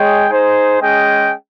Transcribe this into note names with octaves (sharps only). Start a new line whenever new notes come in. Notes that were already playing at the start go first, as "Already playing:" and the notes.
Already playing: G#3 G#4 C#5 G5
D#4 G#4 C5
G#3 C#4 G#4 D#5 G5